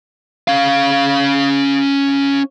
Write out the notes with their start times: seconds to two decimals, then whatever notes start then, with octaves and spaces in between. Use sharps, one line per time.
0.48 C#4 F5